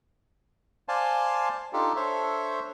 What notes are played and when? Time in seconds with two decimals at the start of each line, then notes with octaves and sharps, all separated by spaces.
0.88 C5 D5 F5 G#5 A5 C6
1.73 D4 D#4 F4 G4 A4
1.96 D4 A4 C5 C#5 E5